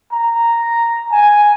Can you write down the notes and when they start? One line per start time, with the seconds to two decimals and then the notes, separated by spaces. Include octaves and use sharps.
0.12 A#5
1.12 G#5